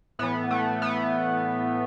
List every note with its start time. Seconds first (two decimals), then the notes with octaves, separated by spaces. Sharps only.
0.19 A2 E3 B3
0.51 A3
0.82 B3